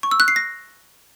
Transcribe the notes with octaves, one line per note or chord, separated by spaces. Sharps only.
C#6
E6
F#6
C7
A#6